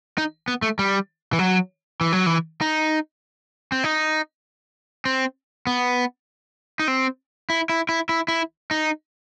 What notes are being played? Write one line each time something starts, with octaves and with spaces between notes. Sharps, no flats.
D#4
B3
A3
G3
E3
F#3
E3
F#3
E3
D#4
C4
D#4
C4
B3
D#4
C4
E4
E4
E4
E4
E4
D#4